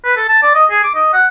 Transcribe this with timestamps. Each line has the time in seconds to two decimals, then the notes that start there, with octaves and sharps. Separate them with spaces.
0.05 B4
0.17 A4
0.29 A5
0.43 D5
0.55 D#5
0.71 G#4
0.83 D6
0.95 D#5
1.13 F#5